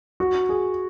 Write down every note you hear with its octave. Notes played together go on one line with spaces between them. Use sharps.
F#4
G#4